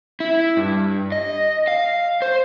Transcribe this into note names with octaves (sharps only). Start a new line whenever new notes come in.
E4
G2
D#5
F5
C5